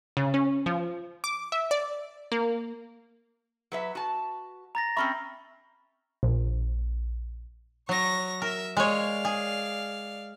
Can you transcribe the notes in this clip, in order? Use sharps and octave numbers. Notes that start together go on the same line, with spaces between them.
C#3
C#4
F3
D6
E5
D5
A#3
F#3 B4 E5
F#4 A5
A#5 A6 A#6
C4 C#4 E5 B5 C#6
A#1
F#3 C#6 A#6
A#4 E5
G#3 C#5 D5 F5
G#4